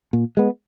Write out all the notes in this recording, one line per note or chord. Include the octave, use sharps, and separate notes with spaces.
A#2
G#3 B3